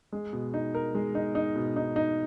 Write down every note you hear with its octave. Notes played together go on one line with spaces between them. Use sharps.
G#3
B2
D#4
A#4
G#3
D#4
D#4
B2
D#4
D#4